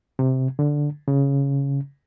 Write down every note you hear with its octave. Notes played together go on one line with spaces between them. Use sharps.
C3
D3
C#3